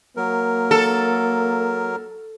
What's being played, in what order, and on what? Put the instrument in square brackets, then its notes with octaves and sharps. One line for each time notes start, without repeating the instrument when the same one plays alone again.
[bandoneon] F#3 A#4 [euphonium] A#3
[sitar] A4